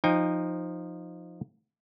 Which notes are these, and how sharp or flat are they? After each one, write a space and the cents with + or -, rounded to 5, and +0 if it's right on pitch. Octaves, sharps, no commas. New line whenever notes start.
F3 +5 D#4 -5 G5 +35